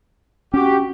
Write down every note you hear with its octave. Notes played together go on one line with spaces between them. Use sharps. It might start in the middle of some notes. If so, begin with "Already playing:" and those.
C#4 F#4 G4